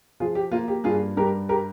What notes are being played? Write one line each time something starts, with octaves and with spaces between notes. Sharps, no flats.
F3 F4 G#4
G4
A#3 F4
G4
G2 F4 G#4
G2 G4 A#4
G4 A#4